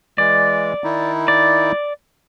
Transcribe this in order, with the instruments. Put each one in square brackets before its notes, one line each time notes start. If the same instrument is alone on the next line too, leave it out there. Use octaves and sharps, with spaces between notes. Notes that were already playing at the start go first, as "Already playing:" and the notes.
[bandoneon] E3 G#3 [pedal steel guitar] D5
[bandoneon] D#3 D#4 E4
[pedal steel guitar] D5